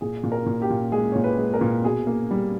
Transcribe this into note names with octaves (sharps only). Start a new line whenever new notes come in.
A#2 G#4
A#2
A#4
A#2
G4
A#2
G#3 G#4
A#2 C#5
B4
G#3
A#4
A#2
B2 G#4
A#3
G3